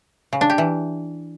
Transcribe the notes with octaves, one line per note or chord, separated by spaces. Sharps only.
C#3
D4
G4
E3